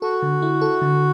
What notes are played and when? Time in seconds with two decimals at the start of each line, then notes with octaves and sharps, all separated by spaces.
0.02 F#4 A4
0.22 D3
0.42 E4
0.61 A4
0.82 D3